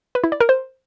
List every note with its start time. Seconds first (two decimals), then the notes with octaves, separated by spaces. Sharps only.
0.15 B4
0.24 E4
0.32 D5
0.40 A#4
0.49 C5